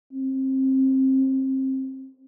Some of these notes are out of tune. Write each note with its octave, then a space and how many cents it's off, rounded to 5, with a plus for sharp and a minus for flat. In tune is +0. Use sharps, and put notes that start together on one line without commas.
C4 +25